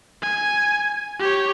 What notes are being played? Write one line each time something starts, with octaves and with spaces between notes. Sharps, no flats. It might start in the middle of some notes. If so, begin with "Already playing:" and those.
G#5
G4 C#5